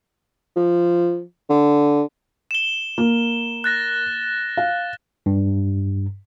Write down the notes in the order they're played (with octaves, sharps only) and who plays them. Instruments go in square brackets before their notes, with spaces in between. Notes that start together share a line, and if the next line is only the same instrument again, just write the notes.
[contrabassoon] F3
D3
[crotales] E7 G7
[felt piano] A#3
[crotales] F#6 A6 A#6
[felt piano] F5
[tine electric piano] G2